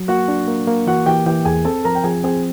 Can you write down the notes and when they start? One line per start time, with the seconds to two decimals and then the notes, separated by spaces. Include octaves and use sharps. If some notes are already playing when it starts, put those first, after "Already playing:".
Already playing: F#3
0.08 A#3 F#4 F#5
0.28 D4
0.47 A#3
0.67 A#3
0.87 E3 F#4 F#5
1.06 E3 G4 G5
1.26 E3 G4 G5
1.45 E2 G#4 G#5
1.65 C4 A4 A5
1.84 F3 A#4 A#5
1.95 G5
2.04 F3 G#4 G#5
2.24 C4 G#4 G#5